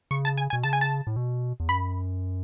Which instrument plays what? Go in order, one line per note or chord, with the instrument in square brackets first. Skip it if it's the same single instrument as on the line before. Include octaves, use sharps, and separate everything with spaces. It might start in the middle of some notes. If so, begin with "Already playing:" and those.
[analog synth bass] C#3 [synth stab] C#6
[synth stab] A5
G#5
G#5
[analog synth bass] B2
[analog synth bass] C#3 [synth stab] A5
[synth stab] G#5
A5
[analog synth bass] A2
B2
E2
[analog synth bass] F#2 [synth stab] B5